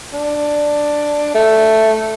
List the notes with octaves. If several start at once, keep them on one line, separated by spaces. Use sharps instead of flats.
D4
A3